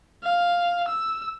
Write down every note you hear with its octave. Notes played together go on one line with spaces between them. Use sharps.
F5
E6